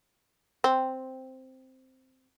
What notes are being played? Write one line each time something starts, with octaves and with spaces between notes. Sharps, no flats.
C4